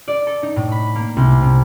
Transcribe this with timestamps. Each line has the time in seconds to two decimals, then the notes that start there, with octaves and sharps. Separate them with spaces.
0.08 D5
0.27 A4
0.43 D#4
0.56 A2
0.72 B5
0.95 A#3
1.17 C2
1.42 C3